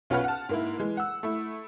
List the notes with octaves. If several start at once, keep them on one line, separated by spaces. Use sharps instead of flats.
B1 C#4 F4 B4 F#5 F6
F#5 A5
G#2 A#3 E4
E3 G#3
F#5 E6
A3 E4